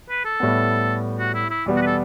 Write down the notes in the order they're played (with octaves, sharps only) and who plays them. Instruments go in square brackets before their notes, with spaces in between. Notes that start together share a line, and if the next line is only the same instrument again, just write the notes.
[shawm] B4
A4
[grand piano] A2 G3 B3
[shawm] F#4
E4
E4
[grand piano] E2 B2 G3 B3
[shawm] F#4
B4
A4